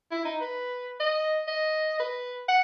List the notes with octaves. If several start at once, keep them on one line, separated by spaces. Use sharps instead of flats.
E4
D#4
B4
D#5
D#5
B4
F#5